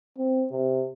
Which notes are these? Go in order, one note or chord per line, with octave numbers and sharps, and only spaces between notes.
C4
C3